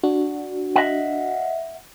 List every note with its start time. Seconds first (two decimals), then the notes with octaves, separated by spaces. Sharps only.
0.03 D4 F#4
0.76 D#5 E5 F#5